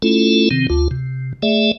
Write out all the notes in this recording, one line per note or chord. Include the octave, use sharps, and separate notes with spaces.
A3 C#4 E4 F4 A4
C3 D#3 C4
D2 F4
C3
A3 G#4 D5 E5